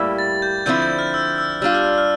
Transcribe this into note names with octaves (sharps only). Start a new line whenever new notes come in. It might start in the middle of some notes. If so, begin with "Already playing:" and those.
Already playing: A2 G3 A#3 E4 G4
A6
G6
D3 F3 C4 E4 G6
G6
F6
E6
E6
G3 D4 F4 E6
F6
F6